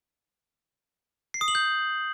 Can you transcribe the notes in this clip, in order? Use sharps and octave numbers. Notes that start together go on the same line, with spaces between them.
C7
D#6
F#7
G6